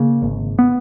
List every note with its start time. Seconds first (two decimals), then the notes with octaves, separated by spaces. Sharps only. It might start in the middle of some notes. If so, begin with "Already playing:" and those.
Already playing: C#3 A#3
0.22 G#1
0.59 B3